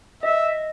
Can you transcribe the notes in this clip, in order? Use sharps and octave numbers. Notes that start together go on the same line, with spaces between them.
D#5 E5